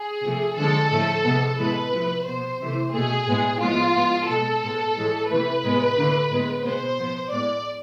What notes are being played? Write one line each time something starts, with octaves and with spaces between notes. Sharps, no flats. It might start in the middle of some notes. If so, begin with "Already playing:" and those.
Already playing: G#4
C3 F3 A3
D3 F3 G#3 A4
A2 F3 A3
C3 G#3 B3
A2 E3 G#3 B3 B4
C3 F3 A3
B2 B3 C5
C3 E3 A3
B2 A3 G#4
A2 G#3 B3
A2 F3 G#3 B3 F4
A2 G#3 B3
B2 G#3 B3 A4
A2 G#3 B3
A2 E3 G#3
C3 E3 A3 B4
A2 G#3 B3
D3 A3
A2 G#3 B3
B2 G#3 B3 C5
A2 F3 B3
A2 G#3 B3 D5